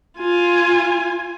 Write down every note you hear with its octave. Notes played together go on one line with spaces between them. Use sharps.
F4 G#5